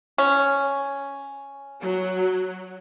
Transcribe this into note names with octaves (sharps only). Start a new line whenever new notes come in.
C#4
F#3